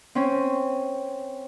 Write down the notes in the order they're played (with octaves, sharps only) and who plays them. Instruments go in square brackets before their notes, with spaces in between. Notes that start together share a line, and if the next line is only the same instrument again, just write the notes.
[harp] C4 C#4